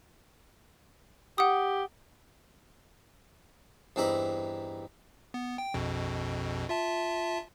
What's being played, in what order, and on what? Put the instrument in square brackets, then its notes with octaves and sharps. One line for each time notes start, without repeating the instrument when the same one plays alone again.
[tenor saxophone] G4 [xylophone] F#5 D#6
[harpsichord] E2 G2 C4 D#4 A#5 B5
[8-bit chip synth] B3
G5
A#1 F2 B2
F4 E5 A5